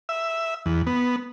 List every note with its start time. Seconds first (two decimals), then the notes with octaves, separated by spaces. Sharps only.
0.09 E5
0.66 E2
0.87 B3